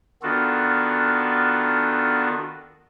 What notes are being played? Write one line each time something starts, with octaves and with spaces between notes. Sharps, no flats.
D#3 B3 D4 F4 F#4 A4